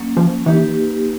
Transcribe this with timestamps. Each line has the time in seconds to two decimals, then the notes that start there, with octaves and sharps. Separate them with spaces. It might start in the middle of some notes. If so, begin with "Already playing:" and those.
Already playing: F#3 A#3 C#4
0.17 F3
0.46 E3 A#3 D#4 G4 B4